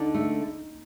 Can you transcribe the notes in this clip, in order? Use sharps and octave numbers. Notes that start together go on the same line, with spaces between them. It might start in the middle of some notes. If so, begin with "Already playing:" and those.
Already playing: D3 D#4
A3